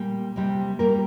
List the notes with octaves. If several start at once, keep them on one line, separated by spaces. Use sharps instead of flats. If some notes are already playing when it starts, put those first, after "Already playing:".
Already playing: A#2 G3 A#3
C3 G3 A#3
G3 A#3 A#4